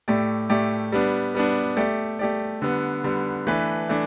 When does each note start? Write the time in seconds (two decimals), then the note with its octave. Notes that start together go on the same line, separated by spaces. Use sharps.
0.08 A2 A3 G4 D5
0.50 A2 A3 G4 D5
0.92 G3 B3 D4
1.35 G3 B3 D4
1.77 A3 G4 D5
2.19 A3 G4 D5
2.62 D3 G3 B3
3.04 D3 G3 B3
3.47 E3 A3 D4 B4
3.89 E3 A3 D4